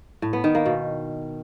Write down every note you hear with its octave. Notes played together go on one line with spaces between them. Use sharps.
A2
B3
D#3
A#3
B2